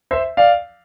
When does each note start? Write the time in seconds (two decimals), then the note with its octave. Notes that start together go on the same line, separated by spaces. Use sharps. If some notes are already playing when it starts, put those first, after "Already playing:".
0.11 C5 E5
0.37 D5 F5